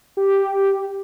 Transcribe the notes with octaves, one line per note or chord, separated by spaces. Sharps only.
G4